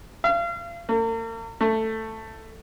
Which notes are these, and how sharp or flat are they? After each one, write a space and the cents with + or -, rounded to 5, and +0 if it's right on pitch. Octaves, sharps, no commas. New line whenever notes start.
F5 -35
A#3 -45
A3 +10